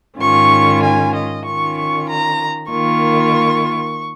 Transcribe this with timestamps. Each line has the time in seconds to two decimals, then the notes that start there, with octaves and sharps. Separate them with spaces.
0.19 G#2 D#3 C#4 F4 C#6
0.82 G#5
1.14 D#5
1.45 D#3 C#4 F4 C#6
1.76 C#6
2.08 A#5
2.70 D#3 A#3 F4 C#6